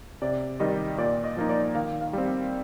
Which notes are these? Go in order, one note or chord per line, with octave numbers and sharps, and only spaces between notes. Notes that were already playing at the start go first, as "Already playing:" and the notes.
C3 D5
D#3 G3 D#5
A#2 D5
D#5
F3 A#3 D#4
D5
D#3 F5
F5
G3 C4
F5